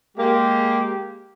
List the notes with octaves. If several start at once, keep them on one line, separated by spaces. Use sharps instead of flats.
G#3 A#3 G4